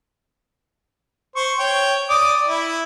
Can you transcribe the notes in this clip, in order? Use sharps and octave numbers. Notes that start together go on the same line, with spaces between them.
C5 C#6
C#5 G5
D5 D6 D#6
E4